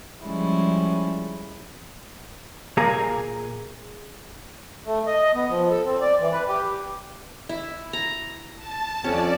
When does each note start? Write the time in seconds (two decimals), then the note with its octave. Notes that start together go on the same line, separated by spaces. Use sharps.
0.24 F3 G3 G#3 C#4 E4
2.77 A#2 A#3 G#4 A#5
4.86 A3
5.07 D#5
5.35 B3
5.50 F3
5.70 A4
5.85 C4
6.01 D5
6.21 E3
6.32 B4
6.48 G4
7.49 E4
7.93 A#5
8.56 A5
9.04 F2 C#4 D5